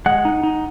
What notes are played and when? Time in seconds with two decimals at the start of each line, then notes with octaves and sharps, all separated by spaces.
0.06 G#3 F#5
0.25 D#4
0.43 D#4